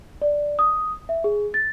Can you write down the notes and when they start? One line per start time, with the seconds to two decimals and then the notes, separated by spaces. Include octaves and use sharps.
0.22 D5
0.59 D#6
1.09 E5
1.24 G#4
1.54 A6